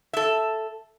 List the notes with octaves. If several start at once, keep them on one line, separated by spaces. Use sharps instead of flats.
A4 E5